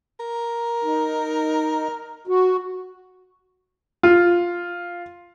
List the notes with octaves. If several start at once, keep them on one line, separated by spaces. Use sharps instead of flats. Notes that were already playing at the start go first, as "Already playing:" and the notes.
A#4
D#4
F#4
F4